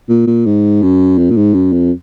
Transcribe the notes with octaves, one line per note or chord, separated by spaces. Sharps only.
A#2
A#2
G#2
F#2
F2
A#2
G#2
F#2
F2